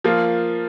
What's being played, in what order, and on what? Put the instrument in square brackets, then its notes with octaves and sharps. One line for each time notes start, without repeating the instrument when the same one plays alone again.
[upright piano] F3 A#3 F4